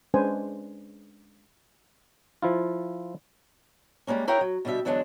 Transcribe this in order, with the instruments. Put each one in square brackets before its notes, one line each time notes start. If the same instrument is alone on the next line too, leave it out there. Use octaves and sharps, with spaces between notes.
[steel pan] G#3 C#4 D4 B4 C5 G#5
[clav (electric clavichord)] F3 E4 F4
[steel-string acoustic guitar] G3 G#3 A#3 C#4
E4 G#4 A#4 C#5 F#5 G5
F#3
B2 D3 G3 G4 E5
E2 D3 F#3 G#3 B3 D4